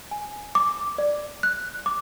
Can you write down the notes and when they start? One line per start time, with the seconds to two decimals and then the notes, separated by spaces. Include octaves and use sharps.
0.11 G#5
0.55 D6
0.98 D5
1.43 F#6
1.86 D6